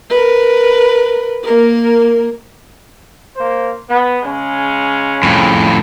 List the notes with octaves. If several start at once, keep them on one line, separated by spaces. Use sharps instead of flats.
A#4 B4
A#3 A#4
A#3 C5
B3
C#3 G#3 C#4
F2 A2